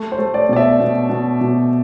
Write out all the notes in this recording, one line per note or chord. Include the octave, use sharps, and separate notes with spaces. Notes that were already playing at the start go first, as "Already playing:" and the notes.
Already playing: A3
C5
A3
D5
B2 D5
E5
B2
B2
B2